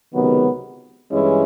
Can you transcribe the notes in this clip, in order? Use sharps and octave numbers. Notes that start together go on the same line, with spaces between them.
C#2 C3 D#3 F#3 B3
G2 E3 G#3 C#4 E4